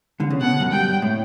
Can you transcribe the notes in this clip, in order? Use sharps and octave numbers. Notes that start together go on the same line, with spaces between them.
D3
C#3
B2 F#5
F#2
G2 G5
A2